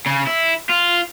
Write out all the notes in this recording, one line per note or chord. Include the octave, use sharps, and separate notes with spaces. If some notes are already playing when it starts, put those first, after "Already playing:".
C#3
E4
F4